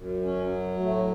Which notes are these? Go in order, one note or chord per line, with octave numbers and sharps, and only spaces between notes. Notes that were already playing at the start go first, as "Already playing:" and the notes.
Already playing: F#2
C#4
F#3
A2 A3